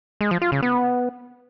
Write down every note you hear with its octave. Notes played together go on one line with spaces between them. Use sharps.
G#3
F3
F4
C#3
B3